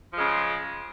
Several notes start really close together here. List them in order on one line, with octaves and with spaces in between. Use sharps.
F3 G#3 C#3